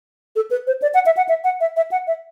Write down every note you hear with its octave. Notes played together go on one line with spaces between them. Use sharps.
A4
B4
C5
D5
F#5
E5
F#5
E5
F#5
E5
E5
F#5
E5